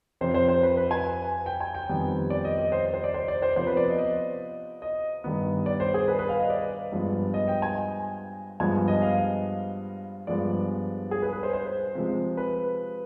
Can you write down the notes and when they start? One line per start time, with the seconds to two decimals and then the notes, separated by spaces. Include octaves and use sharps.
0.21 F2 C3 F3 C5
0.34 C5
0.49 C5
0.63 B4
0.77 B4
0.91 G#5
1.46 G5
1.60 G#5
1.75 G5
1.89 F2 D#3 G3 B3
2.30 D5
2.45 D#5
2.58 D#5
2.72 C5
2.94 C5
3.04 D5
3.14 C5
3.28 D5
3.42 C5
3.56 C3 F3 B3 C5
3.67 B4
3.77 D5
3.88 D#5
3.98 D#5
4.82 D#5
5.24 G2 D#3 B3
5.66 D5
5.80 C5
5.94 G#4
6.08 B4
6.19 B4
6.29 F5
6.40 D#5
6.50 D5
6.92 G2 F3 G#3 B3
7.34 D#5
7.48 G5
7.62 G#5
8.60 G2 F3 G#3 B3 G#5
8.88 D#5
9.02 F5
10.27 G2 F3 G#3 B3 D5
11.11 G#4
11.22 B4
11.33 B4
11.43 C5
11.53 C5
11.95 C3 F3 G#3
12.37 B4